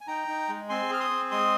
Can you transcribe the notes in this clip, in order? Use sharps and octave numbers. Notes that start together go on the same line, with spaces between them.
G#5
D#4 G5 A#5
D#4
G#3
C4 G#5 C6
G#4 F6
C6 D#6
C4
G#3 C6 D#6